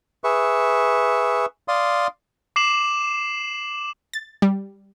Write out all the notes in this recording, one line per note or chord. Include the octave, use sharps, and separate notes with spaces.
G#4 B4 E5 C#6
D5 F5 C6 D#6
D6 C7 E7 F#7
A6
G3